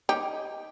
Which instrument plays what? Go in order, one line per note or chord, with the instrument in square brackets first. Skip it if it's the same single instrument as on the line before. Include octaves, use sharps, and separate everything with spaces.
[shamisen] D#4 G4